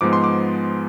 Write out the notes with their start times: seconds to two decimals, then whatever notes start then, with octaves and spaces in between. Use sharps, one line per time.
0.01 G#2 F3 G#3 B3 D6
0.13 C6
0.24 D6